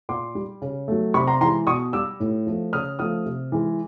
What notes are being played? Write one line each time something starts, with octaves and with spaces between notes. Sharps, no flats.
A#2 C6 D6
G3
C#3
F#3 A3
C3 B5 C#6
A#5 C6
E3 G#3 A#5 C6
B2 C#6 D#6
G3 D6 E6
A2
F3 A3
C#3 D#6 F6
F3 A3 D#6 F6
C3
E3 G#3